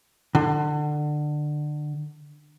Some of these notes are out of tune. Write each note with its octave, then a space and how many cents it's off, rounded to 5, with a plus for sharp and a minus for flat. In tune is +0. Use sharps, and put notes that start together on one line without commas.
D3 +25